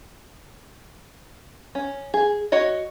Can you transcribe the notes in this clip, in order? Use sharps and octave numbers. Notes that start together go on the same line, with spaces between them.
C#4
G#4
F#4 C#5 D#5